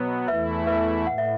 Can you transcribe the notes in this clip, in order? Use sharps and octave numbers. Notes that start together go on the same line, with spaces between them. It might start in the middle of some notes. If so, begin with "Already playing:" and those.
Already playing: B2 F#3 B3
E2 E3 A3 E4 B4 E5
B4 E5
A2 F#5
E5